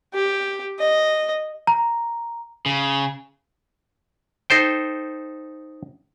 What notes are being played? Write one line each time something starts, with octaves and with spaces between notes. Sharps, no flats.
G4
D#5
A#5
C#3
D#4 A4 C5 G5